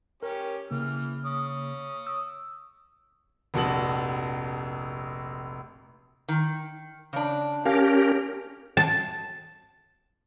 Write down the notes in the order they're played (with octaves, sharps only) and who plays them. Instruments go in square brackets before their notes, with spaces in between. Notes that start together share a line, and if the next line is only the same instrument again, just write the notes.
[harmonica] C#4 G4 [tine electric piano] A#4
[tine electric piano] C#3 A#3 [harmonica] E3 F6
[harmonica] C#5 D#6
[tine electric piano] E6
[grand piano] F1 A#1 F#4 A5 F#7
[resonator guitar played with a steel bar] D#3
C#3 D4
[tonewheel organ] C#4 G4 A#4 [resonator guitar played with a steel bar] F5
[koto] A5